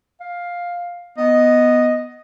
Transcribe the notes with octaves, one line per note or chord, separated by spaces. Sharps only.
F5
B3 D#5